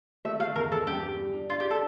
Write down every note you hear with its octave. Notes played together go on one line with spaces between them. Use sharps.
A3 E5
A3 F5
E2 A#4
E2 A4
G2 G4
G2
G3
D4
D4 F4
G4
D4
A4